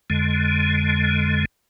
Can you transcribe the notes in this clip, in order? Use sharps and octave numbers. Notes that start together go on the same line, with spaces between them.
F2 D3 G#3